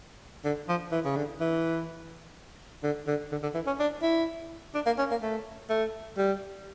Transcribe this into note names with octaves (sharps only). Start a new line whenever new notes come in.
D3
F3
E3
C#3
D3
E3
D3
D3
D3
D3
E3
C#4
D4
E4
D4
A#3
C#4
A#3
A3
A3
G3